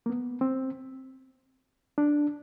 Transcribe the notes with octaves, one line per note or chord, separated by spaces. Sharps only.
A#3
B3
C4
D4